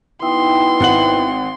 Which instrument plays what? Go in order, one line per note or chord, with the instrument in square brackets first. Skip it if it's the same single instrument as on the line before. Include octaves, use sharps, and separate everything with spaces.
[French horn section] B2 B3 E4 [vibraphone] D#4 G5 E6 [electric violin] C6
[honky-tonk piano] G#1 F#5 F#7